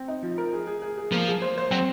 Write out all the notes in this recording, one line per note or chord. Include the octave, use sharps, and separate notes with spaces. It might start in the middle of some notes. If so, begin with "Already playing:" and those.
Already playing: C4
D#4
F3
A#4
G#4
G#4
G#4
G#4
F3 A#3
G#4
C5
C5
F#3 C4